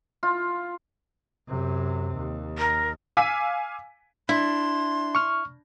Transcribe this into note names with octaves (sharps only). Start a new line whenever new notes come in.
F4
F#2 C3
D#2
A#4
F5 G#5 D6 E6 B6 D#7
D4 E4 C6
C#6 F6